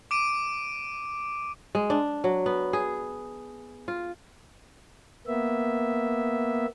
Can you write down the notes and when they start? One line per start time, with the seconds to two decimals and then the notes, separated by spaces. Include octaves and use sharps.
0.11 D6 D7 D#7
1.75 G#3
1.90 D4
2.24 F#3
2.46 B3
2.73 G#4
3.88 F4
5.27 A#3 B3 E5